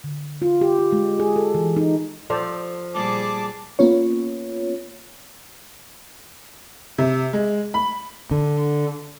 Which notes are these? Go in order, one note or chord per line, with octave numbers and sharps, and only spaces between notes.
D3
F4
G4
F4
G#3
G#4
A4
E3
D#4
F3 A4 C5 D5
A#2 G3 G#4 A5 D6
A#3 B3 C#4 F4 C#5
C3
G#3
B5
D3